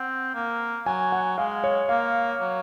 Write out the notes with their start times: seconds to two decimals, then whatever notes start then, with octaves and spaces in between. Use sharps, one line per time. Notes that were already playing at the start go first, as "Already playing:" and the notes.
Already playing: C4 F#5
0.34 A#3
0.86 F#3 G#5
1.12 F#5
1.38 G#3 F5
1.64 C#5
1.89 A#3 F5
2.41 F#3